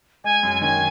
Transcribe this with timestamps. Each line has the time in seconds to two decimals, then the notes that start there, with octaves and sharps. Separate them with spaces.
0.24 G#3 G#5
0.43 F#2
0.61 D#3 G#5